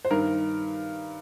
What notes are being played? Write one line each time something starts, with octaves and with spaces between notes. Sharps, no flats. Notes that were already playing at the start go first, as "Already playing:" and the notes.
C5
G2 D#3 A#4